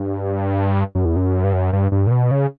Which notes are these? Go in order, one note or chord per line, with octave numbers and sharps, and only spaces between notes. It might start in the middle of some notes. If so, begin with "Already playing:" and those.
Already playing: G2
F#2
E2
F#2
G2
F#2
G2
G2
A#2
B2
C#3